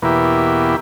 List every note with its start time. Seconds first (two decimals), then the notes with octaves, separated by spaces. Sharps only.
0.02 E2 B2 A#3 E4 G4